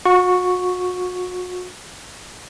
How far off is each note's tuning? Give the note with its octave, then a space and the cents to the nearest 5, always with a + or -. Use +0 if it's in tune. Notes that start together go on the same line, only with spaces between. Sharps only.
F#4 -35 C#6 +0